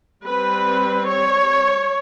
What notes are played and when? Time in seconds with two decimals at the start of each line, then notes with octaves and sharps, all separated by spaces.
0.24 G3 C4 B4
1.08 C#5